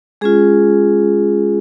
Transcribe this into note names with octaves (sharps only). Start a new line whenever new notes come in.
G#3 C#4 F4 G#4